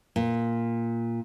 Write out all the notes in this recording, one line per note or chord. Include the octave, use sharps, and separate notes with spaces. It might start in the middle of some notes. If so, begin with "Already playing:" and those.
A#2